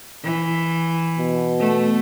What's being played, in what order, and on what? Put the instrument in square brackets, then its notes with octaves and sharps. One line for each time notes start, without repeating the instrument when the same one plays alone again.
[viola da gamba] E3
[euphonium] B2
[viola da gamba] A3